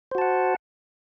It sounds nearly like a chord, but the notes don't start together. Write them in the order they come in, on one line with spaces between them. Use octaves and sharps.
C5 F#4 A5 F#5